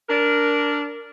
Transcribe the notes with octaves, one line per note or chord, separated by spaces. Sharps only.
D4 A#4